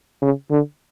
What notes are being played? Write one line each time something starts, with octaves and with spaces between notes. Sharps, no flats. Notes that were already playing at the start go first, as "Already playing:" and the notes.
C#3
D3